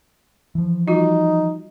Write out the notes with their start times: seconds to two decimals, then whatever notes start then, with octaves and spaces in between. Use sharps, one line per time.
0.55 E3 F3
0.88 G3 D#4 F4 F#4